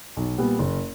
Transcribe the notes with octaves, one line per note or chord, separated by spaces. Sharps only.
B1
A#2 G3 B3
F#1